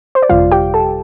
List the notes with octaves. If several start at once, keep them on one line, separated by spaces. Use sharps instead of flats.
C5
D5
G1 F2 C3 G3 F4 F5
G4 G5
A4 A5